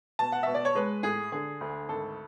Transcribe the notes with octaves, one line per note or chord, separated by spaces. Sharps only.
B2 A5
F#5
B2 E5
D5
C#5
G#3 B4
A2 G#4
D3 G#4
D2
G#1 A4